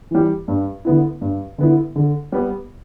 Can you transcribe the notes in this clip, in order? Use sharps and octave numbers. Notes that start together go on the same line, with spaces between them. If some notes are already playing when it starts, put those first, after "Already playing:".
E3 G3
G2
D3 B3 E4
G2
D3 B3 E4
D3
G3 B3